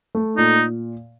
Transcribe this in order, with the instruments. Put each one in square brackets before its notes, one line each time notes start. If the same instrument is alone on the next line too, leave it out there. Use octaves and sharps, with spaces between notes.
[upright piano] A3
[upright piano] A#2 [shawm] D#4